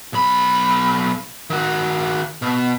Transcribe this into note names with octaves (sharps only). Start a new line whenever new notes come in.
B1 B5
D#3 F#4
B2